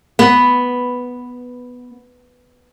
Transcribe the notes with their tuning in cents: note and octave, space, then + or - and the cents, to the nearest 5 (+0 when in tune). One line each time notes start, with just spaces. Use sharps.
B3 +0